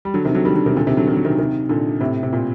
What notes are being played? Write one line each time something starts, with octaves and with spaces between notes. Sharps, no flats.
G3
D3 F#3
C3 D#3
D3 F#3
D#3 G3
D3 F#3
C3 D#3
A#2 D3
C3 D#3
D3 F#3
D#3
F#3
C3 D#3
C3 D#3
A#2 D3
A2 C3
C3
A#2